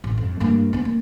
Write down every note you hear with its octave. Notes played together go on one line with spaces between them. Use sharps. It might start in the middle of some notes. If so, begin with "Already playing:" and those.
A1
F2
G2 A#3
B3 D#4
A#3